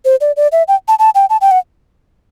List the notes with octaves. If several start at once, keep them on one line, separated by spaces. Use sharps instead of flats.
C5
D5
D5
E5
G5
A5
A5
G5
A5
G5
F#5